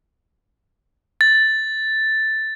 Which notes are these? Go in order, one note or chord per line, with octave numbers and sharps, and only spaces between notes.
A6